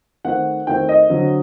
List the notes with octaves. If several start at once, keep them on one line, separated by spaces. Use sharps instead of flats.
D#3 A3 C4 F#5
D#3 A3 C4 G5
D#5
D3 F#3 C4